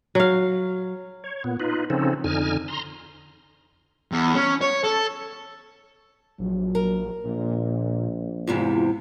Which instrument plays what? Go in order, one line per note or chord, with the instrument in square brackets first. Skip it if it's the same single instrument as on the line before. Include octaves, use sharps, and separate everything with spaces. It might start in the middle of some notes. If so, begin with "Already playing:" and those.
[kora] F#3 F5
[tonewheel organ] C#5
A#2 B3
D#4 F4 B4
C#3 F3 C4 C#4 D#4 A4
F2 D3 D#4 G#5 F6
A#5 C6
[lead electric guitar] E2
C#4
C#5
A4
[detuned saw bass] A#1 [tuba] F#3
[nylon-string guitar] A#4
[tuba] A#1 [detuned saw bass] A#2
[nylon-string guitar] E2 G#2 C3 [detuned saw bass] F4